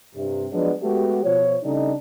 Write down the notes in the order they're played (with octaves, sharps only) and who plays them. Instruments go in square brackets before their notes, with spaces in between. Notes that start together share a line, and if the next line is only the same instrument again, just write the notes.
[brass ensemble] G2 C3
F3 F#3 G#3 B3 D4
G#3 A3 B3 F#4 G4
B2 F3 C#5
C#3 G3 A3 D4 D#4